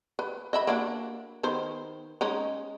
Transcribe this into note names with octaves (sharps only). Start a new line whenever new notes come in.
B4
D#5 E5 B5
A#3 D4 F#4
D#3 B3 C5
G#3 C#4 D#4